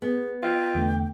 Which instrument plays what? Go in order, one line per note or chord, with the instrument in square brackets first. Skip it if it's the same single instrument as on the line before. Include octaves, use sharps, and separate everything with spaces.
[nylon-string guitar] B3 [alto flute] G#4
[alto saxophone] F4 [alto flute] G5
[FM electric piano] E2 D3 A3